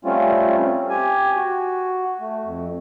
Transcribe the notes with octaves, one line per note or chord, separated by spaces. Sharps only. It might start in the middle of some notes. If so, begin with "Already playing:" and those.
G3 A3 C4 C#4 F4
C4
G4 G#5
F#4
A3
F2